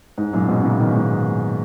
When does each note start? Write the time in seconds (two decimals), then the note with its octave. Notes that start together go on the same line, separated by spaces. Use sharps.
0.18 G#2
0.33 F#2 A#2
0.48 G#2 B2
0.63 A#2 C#3
0.78 B2 D#3
0.94 G#2